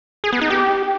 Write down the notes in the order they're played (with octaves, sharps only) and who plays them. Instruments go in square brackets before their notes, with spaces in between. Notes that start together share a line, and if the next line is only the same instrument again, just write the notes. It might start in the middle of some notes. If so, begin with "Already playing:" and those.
[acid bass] G#4
B3
D#4
G4